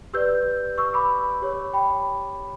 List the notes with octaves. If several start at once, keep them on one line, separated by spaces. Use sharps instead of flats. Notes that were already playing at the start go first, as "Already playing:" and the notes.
G4 B4 D5 E6 G6
C#6 E6
B5 D6
G4 C#5
G5 B5